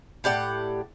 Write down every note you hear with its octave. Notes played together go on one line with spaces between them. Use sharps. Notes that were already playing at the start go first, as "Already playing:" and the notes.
A2 G4 D5 F#5